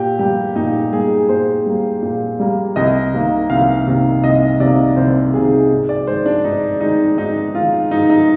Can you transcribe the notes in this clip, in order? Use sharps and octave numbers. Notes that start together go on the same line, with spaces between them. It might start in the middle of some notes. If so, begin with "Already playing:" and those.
Already playing: A#2 G4
G3 A#3 G4
A#2 D#4
G3 A#3 G#4
A#2 C5
G3 A#3
A#2
G3 A#3
C2 D#5
C3 D#3 A#3
C2 F5
C3 D#3 A#3
C2 D#5
C3 D#3 A#3 D5
C2 C5
C3 D#3 A#3 G#4
G#2
D5
D#3 G#3 C5
D4
G#2 D#4
D#3 G#3 D#4
G#2 D#4
D#3 G#3 F4
G#2 D#4
D#4